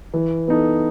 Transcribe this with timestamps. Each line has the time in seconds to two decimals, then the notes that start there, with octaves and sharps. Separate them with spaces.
0.14 E3
0.48 B3 D#4 A4